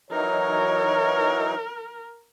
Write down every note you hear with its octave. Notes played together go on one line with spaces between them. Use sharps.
E3 F#3 D#4 A#4 C#5